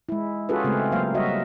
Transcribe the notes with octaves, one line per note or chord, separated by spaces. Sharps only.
G#3 E4
C#4 F4 F#4 G#4 A4 B4
C#3 G#3 A3 C4 A4
F#3 A#3 C5 F5
G3 F#4 D#5 E5